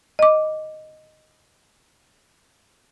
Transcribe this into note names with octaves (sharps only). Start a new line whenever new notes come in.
D#5 D6